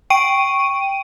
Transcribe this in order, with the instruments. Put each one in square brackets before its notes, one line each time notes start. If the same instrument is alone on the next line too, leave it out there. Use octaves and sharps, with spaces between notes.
[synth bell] G5 C#6 D7 D#7